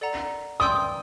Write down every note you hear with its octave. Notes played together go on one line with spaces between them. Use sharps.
A4 D5 F#5 A#5
D5 G5 C6 D#6 E6 G6